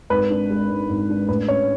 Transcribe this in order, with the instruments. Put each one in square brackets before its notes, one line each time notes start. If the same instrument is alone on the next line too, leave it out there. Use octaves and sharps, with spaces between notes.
[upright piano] G#1 [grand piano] B4
[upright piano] D4
G#3
G#2
G#1
D4
[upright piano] A1 [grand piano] B4
[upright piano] C#4 [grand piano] C#5